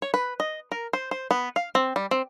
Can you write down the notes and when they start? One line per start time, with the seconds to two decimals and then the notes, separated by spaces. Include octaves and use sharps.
0.02 C#5
0.14 B4
0.40 D#5
0.72 A#4
0.93 C5
1.11 C5
1.31 B3
1.56 F5
1.75 C4
1.96 G3
2.11 C4